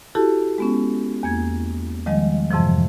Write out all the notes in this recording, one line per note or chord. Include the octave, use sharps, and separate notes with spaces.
E4 F#4 G4 A4 A5
G#3 B3 C#4
E2 A#3 G#6
D#3 F3 G3 G#3 D#5
F2 G#2 C3 E3 F3